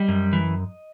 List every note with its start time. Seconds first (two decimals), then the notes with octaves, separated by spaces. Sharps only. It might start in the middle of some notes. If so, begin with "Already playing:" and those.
Already playing: G3 D#5
0.08 F#2
0.33 E3